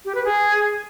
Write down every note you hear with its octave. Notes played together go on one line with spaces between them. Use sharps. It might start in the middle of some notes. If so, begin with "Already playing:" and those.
G4
B4
G#4